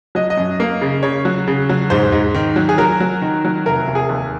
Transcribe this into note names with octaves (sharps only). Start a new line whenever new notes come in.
F#3 D#5
D#5
F#2
A#3
C#3
C#3 C#5
F#3
C#3
F#3
G#2 C5
G#2
D#3
F#3
G#4
F#3 A#4
F#3
D#3
F#3
F1 A#4
F1
G#4
D#2